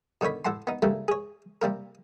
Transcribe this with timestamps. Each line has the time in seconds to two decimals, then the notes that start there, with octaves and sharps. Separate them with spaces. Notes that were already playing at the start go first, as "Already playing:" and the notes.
0.21 B2 D3 D#3 C#5 B5
0.45 A2 A4 F#5 A5 C6
0.67 B3 D#4
0.82 C#3 E3 G3 A3 A#3 D4
1.08 G#4 C#5
1.62 C3 G3 A#3 A#4